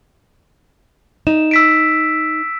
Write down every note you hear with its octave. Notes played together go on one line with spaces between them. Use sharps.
D#4 E7
E6 B6 D7